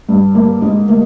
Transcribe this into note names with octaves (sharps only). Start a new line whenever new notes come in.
G2
A#3
G#2
A#3